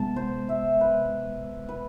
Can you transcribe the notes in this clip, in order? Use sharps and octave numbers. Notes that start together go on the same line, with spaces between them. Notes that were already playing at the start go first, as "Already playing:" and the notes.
Already playing: C3 G#3 B3 A5
C5
E5
B4
B4